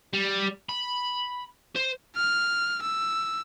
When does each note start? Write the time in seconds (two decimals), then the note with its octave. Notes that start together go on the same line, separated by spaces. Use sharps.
0.14 G3
0.69 B5
1.76 C5
2.16 F6
2.83 E6